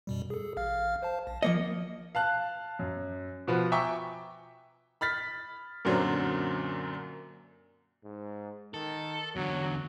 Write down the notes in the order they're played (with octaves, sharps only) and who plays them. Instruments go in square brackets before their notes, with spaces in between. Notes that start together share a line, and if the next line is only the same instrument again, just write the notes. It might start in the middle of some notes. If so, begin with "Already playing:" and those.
[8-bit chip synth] F#2 B2 G3
G#4 A4
A1 F5 F6
C5 F5 A5
A#1
[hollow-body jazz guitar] F3 A#3 D#5 [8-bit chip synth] C#7
[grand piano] F5 A5 F#6
F#2
B2 F3 B3
E5 G5 G#5 A#5 C#6 D6
[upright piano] B5 F6 A6 B6
F#2 A#2 D3 F#3 C4
[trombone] G#2
[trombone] D#3 [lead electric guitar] A4
[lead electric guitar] E2 D3 [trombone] F#3